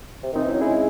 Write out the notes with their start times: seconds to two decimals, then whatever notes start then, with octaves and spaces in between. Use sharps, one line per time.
0.23 C3
0.32 D#3 C4 D#4
0.42 E3
0.48 C#4 E4
0.52 F#3
0.61 G#3 E4 G#4